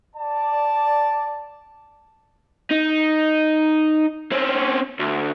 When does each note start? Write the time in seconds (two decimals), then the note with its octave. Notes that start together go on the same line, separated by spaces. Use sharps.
0.16 D5 A5
2.71 D#4
4.32 C4 C#4
4.99 D2